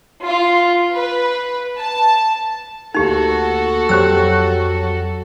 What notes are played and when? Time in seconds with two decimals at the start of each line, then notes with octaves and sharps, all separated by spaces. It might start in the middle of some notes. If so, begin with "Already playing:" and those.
0.24 F4
0.93 B4
1.77 A5
2.95 D2 A#3 D#4 F#4 G4 A4 A5
3.89 F2 F#3 G4 C5 G5 E6